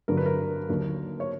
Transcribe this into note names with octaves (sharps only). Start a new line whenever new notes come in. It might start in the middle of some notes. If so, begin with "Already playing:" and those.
G2 D3 F#3 A#4
B4
A#4
D#2 D3 F#3
C#5